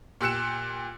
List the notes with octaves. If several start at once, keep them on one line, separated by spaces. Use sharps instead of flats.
A#2 G4 E6 F#6 C#7 E7